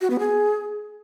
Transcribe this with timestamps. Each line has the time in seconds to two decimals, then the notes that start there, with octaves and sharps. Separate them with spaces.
0.01 F#4
0.10 B3
0.19 G#4